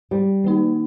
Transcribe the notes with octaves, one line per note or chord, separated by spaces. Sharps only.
G3
D#3 A#3 D#4